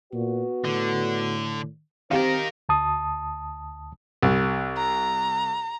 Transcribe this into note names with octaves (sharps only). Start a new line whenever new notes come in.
A#2 B3 F#4 B4
A2 D3
D#3 C4 G4 A#4 C5 F5
D2 A5 D#6
C2
A#5